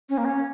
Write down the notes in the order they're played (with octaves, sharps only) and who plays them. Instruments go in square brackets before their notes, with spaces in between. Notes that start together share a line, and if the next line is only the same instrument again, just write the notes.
[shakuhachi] C#4
A#3
C#4